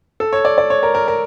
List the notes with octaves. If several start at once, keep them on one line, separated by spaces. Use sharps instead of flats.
A4
C#5
D5
D5
C#5
A#4
A#4
A#4